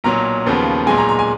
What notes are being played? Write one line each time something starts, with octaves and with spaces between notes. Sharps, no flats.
B1 A#2 F#3 A#5
D#2 C#3 F3 B3
B1 A#2 G#3 G#5
A#5
A#5
G#5